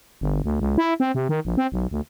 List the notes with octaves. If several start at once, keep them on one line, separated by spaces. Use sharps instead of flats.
G1
D2
C#2
E4
C4
C3
D#3
A#1
C4
B1
D2